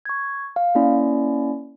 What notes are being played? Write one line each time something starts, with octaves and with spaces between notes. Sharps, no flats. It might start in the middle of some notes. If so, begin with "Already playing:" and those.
C#6 G#6
F5
A#3 C#4 E4 D5